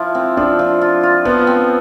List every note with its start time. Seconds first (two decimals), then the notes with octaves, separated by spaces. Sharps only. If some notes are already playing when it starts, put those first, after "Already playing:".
Already playing: F3 E4 F4
0.15 C4
0.37 F3 D4
0.59 F3
0.81 F4
1.03 F4
1.25 F3 B3
1.47 C4